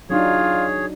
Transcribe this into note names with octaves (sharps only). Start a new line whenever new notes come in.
F#3 D4 D#4 F4 G#4 C#5